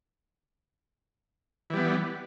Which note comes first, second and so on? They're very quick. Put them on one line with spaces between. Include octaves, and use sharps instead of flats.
E3 G3 B3